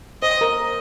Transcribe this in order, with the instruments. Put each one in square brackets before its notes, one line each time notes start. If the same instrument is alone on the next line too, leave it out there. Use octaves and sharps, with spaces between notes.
[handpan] C5 [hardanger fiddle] D#5
[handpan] A#4